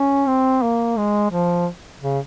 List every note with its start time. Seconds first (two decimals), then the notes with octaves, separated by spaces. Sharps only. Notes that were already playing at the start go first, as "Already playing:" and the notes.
Already playing: C#4
0.27 C4
0.62 A#3
0.97 G#3
1.31 F3
2.01 C#3